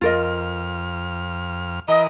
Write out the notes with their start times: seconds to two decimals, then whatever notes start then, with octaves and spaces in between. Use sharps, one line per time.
0.01 F2 F4 A#4 D#5 F6
1.88 E3 A#4 D#5 D#6